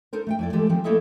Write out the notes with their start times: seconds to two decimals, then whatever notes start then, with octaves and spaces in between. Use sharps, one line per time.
0.13 D#4 A4 A#4 C5
0.27 A3 E5 G5
0.39 F2 E4 D5
0.53 E3 G#3 A3 F4 G4 A4
0.69 D#3 F3 C4
0.84 A3 A#3 E4 A4 D#5 E5